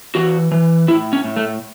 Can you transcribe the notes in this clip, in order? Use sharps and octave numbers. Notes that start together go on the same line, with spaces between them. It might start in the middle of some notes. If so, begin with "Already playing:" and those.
E3 F#4
E3
A2 E4
C#4
A2
A3